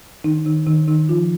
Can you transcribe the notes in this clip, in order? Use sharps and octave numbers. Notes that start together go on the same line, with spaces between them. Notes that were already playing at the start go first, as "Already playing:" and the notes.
D#3 D#4
D#3 D#4
D#3 D#4
D#3 D#4
F3 F4